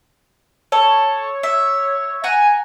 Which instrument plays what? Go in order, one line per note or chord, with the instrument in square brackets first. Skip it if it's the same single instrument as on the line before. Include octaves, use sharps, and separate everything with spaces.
[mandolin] A4 [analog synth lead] C#5
[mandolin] E5
[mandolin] F#5 A#5 [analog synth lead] G#5